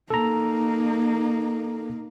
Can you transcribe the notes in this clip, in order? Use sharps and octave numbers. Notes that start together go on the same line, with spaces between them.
A#3 D#4 A4 A#5